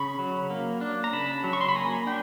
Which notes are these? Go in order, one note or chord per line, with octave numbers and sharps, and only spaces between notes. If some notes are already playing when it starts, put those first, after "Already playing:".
Already playing: C#3 B5 C#6
F#3
A#3
D4
A#5
C#3 A5 B5
F#3
C#6
C6
B5
A#3 G#5 A#5
D4 G5